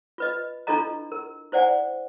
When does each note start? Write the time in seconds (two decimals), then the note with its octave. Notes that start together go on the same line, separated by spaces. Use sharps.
0.18 F4 B4 D#5
0.67 D4 E4 F4 A4 D#5 A#5
1.12 A#4
1.52 E4 C5 D5 F#5 G#5